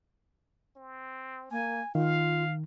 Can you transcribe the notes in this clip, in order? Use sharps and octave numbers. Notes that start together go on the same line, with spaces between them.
C4
A#3 G#5
D#3 F4 F5